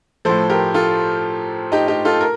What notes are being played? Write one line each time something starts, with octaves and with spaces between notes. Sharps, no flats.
A2 F3 A4 C5
G4 A#4
F4 A4
D#4 G4
D#4 G4
F4 A4
A#4